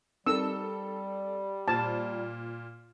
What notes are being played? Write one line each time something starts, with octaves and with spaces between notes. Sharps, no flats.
G3 C4 D#4 A4 A#4 E6
A#2 C5 A5